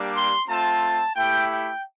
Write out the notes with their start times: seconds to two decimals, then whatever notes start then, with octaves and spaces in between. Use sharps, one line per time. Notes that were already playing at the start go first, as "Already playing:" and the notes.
Already playing: G3 A#3 D4 G4
0.14 C6
0.48 A3 C4 F4 A5
1.15 A3 E4 G4 G5
1.51 G5